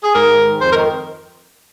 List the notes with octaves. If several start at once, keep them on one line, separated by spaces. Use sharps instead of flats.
G#4
G#2 A#4
D#3
G#2
F2 C5
A#4
D#3